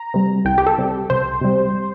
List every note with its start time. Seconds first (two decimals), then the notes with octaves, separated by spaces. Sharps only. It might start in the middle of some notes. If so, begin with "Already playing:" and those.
Already playing: A#5
0.14 C3 G3
0.45 C2 G5
0.58 G4
0.66 A4
0.78 C3 G3
1.10 C2 C5
1.41 C3 G3